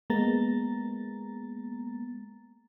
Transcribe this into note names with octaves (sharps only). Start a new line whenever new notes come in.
G#3 A#3 B3 A#5 A6